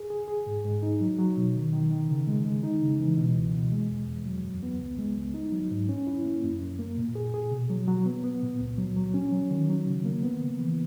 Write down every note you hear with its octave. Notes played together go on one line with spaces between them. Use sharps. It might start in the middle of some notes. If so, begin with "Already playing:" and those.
Already playing: G#4
G#4
G#4
G#2
G#2
D#4
F#3
F#3
B2
D#3
D#3
D#3
C#3
G#3
G#3
D#4
C#3
E3
B2
C#2
B2
G#3
E2
E2
F#3
F#2
B3
C#2
G#3
C#2
D#4
F#3
G#2
C#4
E4
A#3
F#2
F#2
A#3
A#2
G#4
G#4
B2
F#3
F#3
B3
B3
A#2
C#2
F#3
F#3
C#4
F#3
D#3
F#3
C#3
A#3
B3
C#3
E3